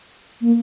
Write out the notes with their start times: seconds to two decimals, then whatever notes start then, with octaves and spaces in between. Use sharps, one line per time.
0.41 A#3